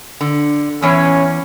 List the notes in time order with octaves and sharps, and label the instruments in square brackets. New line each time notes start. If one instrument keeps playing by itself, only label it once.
[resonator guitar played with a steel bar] D3
[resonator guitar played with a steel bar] E2 E3 C#5 [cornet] C#4